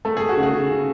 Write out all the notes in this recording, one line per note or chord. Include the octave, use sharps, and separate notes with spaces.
A3 A4
A3 G#4
F#4
C#3
G#4
C#3
C#3